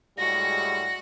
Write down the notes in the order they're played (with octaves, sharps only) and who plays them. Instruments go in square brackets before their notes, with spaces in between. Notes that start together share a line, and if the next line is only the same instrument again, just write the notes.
[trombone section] A2 G3 G#3 [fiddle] F#4 F#5 [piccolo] A#6